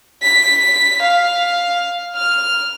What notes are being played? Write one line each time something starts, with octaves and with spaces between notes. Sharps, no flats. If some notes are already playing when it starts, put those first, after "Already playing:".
B6
F5
F6